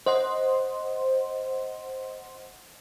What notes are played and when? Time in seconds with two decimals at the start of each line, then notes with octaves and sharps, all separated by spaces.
0.06 C5 D#5 F#5 C6